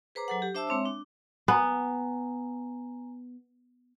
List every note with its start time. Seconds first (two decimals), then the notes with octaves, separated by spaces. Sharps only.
0.15 G#4 B4 C5 A#5 D6
0.28 F#3 A4 F#5
0.42 G4
0.55 D4 C5 E5 A5 D6 E6
0.67 G#3 C4 C#5 E5
0.86 D4
1.48 B3 G#5 A#5